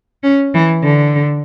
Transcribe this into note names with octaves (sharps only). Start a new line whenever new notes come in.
C#4
E3
D3